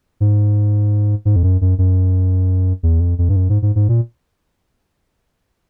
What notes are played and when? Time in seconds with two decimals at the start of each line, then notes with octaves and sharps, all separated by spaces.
0.20 G#2
1.25 G#2
1.36 F2
1.43 F#2
1.61 F#2
1.78 F#2
2.83 E2
3.00 F2
3.18 F2
3.29 G2
3.36 F#2
3.49 G#2
3.62 G#2
3.76 G#2
3.89 A#2